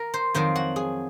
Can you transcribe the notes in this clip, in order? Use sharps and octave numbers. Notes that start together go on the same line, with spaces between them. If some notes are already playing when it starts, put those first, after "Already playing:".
Already playing: A#4
C5
F2 D#3 F#3 C4 C5
F#4
G#4